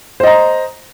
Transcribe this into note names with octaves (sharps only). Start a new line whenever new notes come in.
C5 D#5 A#5